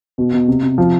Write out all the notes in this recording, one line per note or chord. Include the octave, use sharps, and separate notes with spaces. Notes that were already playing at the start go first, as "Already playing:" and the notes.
B2
B2
C3
C3
F3